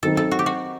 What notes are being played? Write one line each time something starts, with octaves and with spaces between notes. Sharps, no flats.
D#3 F#3 C4 D#4 A4
A4
F#4
G4
F#4